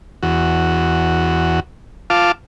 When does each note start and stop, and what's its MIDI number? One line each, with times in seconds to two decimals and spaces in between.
0.23 1.60 40
0.23 1.60 66
2.10 2.32 65
2.10 2.32 77
2.10 2.32 81
2.10 2.32 86